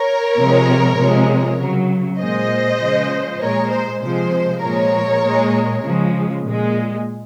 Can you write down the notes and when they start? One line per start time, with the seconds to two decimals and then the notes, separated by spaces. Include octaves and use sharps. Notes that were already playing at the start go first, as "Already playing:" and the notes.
Already playing: A#4 C#5
0.37 C3 F3 G#3
0.97 C3 F3 G#3
1.58 C#3 F#3
2.18 A#2 G#3 C5 D#5
2.79 C#3 F3 G#3
3.40 A#2 G#3 A#4 C#5
3.70 C5
4.01 C3 F3 G#3 C5
4.61 A#2 F3 G#3 A#4 C#5
5.23 A#2 G#3
5.83 C#3 F3 G#3
6.44 A#2 G#3